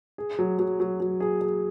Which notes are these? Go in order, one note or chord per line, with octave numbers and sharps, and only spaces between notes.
G#4
F#3
F#3
F#3
F#3
G#4
G#4